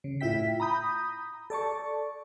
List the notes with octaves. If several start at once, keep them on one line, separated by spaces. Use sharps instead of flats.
C#3
A2 E4 F4 E5 G5 B6
A#5 B5 D#6 G6
A4 D5 A5 C#6